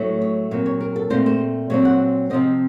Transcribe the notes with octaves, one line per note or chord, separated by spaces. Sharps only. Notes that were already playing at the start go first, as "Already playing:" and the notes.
Already playing: A2 F#3 A3
C#5
A#2 F#3 C4 C#5
C#5
A#4
A4
A#2 A3 C4 C5
C5
A#2 F#3 C4 C#5
F#5
C3 F3 C4 D#5